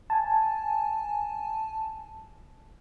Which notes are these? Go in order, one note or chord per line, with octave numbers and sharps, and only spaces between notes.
G#5 A5